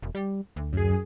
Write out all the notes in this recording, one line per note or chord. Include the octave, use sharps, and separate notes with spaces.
E1
G3
D2
F#2 G#4